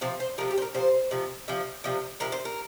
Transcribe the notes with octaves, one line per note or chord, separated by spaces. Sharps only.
C3 F3 C5
C5
C3 F3 A#4
G4
C5
A#4
C3 F3 C5
C3 F3
C3 F3
C3 F3
C3 F3 A#4
C5
A#4